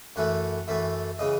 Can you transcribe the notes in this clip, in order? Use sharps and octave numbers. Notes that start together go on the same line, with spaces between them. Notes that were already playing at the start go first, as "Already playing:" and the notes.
F#2 E3 A3 F#5
F#2 E3 A3 E5
C#3 E3 D#5